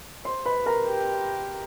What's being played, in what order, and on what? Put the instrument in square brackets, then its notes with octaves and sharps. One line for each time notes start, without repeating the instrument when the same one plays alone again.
[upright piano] C5 C6
B4 B5
A#4 A#5
[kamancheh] G4